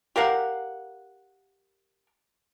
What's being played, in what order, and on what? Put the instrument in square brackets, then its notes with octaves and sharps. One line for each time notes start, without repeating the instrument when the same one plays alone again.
[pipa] G4 A#4 F5 F#5